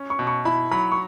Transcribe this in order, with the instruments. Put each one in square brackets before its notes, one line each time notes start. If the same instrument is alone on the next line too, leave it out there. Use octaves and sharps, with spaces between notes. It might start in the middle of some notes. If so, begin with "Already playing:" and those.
Already playing: [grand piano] C#4
[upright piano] C#6
[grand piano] B2
[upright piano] C#6
[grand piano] E4 [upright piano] B5
[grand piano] F#3 [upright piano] B5
[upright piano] C#6